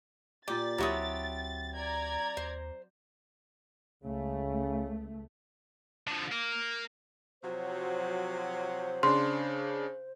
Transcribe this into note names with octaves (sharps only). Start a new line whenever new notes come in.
A#2 G4 D5 A6
D2 F#3 C4 E4 G4 C#6 D#6
D5 A#5 G#6
D#2 C5
C#2 C#3 A3
D3 F3
A#3
C3 F3 F#3 C5
C#3 D4 C6